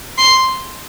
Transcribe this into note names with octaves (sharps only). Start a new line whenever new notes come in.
C6